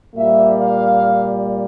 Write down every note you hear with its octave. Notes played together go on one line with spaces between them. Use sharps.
A#2 G3 A#3 E5
F5